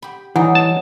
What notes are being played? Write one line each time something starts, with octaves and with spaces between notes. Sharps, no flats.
G4 B5
E3 F#3 G3 D#4 E4 F#5 G#5
A5